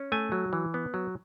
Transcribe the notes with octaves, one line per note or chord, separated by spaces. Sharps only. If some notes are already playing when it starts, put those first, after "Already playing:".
Already playing: C#4
A3 G#5
F#3
E3
B3
F#3